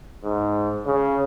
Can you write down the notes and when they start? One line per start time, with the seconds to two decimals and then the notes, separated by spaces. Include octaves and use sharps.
0.24 G#2
0.86 C#3